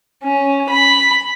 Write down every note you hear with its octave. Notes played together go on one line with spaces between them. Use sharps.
C#4
B5